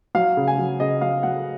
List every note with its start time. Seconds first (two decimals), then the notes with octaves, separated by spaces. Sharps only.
0.15 F#3 F5
0.37 C#3
0.48 G#5
0.58 F#3
0.80 C#3 D#5
1.01 F#3 F5
1.23 F#3 F#5